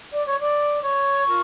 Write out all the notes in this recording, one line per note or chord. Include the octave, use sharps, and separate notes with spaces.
D5 D6
C#5 C#6
D5 D6
C#5 C#6
F4 A#4